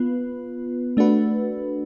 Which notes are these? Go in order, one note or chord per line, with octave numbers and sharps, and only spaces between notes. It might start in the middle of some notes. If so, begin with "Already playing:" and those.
Already playing: B3 F4 B4
A3 D4 F#4 B4